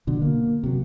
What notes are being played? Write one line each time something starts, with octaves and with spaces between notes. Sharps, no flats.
B2 D3 F#3
A#3
C3 F#3